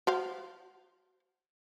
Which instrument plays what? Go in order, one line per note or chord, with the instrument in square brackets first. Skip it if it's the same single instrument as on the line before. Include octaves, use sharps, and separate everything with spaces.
[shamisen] F#4 C5 F5